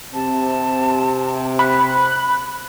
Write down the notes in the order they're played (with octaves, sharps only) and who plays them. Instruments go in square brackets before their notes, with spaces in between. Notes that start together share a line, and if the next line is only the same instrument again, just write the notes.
[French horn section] C3 [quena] A5
[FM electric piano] B5 [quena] F#6